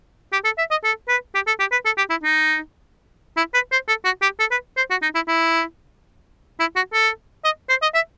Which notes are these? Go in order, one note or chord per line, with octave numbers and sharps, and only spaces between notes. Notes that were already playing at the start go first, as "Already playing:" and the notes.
G4
A4
E5
D#5
A4
B4
G4
A4
G4
B4
A4
G4
E4
D#4
E4
B4
C5
A4
F#4
G4
A4
B4
C5
F#4
D#4
E4
E4
E4
F#4
A4
D#5
C5
D#5
E5